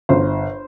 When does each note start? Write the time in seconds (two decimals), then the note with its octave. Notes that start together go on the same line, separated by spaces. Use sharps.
0.09 G1 C5